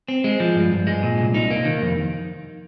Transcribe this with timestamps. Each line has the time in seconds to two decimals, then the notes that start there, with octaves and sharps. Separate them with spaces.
0.08 C4
0.24 G#3
0.40 F3
0.56 G2
0.72 G2
0.87 G#3
1.03 A#2
1.19 C2
1.34 D#4
1.50 A#3
1.65 D#3
1.82 F2